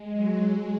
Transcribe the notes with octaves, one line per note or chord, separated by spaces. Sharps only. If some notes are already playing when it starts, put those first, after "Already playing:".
Already playing: G#3
F#3
G#3